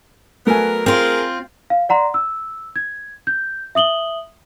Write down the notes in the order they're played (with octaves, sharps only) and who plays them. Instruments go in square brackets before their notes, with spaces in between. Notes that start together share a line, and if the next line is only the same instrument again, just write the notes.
[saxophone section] F#3 B3 A#4 [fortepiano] A3 G#5
[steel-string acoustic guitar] C4 F4 [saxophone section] G#4 A#4
[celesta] F5
D5 F#5 A#5 C6
E6
G#6
G6
E5 D#6 F#7 G7